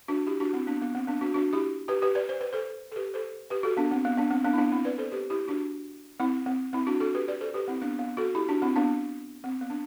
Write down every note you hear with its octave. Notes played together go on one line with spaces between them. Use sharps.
D4 F#4
E4 G4
D4 F#4
C4 E4
B3 D4
B3
C4
B3 D4
D4 F#4
D4 F#4
E4 G4
G4 B4
G4 B4
B4 D5
C5
B4
A4 C5
A4
G4 B4
A4 C5
G4 B4
F#4 A4
B3 D4
C4
B3
B3 D4
C4
B3 D4
E4
B3 D4
C4 E4
B4 D5
A4 C5
G4 B4
E4 G4
D4 F#4
C4 E4
C4
C4 E4
D4 F#4
F#4 A4
G4 B4
B4 D5
A4 C5
G4 B4
C4 E4
B3 D4
B3
F#4 A4
E4 G4
D4 F#4
C4 E4
B3 D4
C4
B3
D4